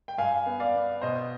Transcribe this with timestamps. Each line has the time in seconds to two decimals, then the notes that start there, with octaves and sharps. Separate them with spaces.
0.08 G5
0.18 G2 F5 G#5
0.46 B3
0.60 D5 F5
0.75 B3
1.02 B2 C5 D#5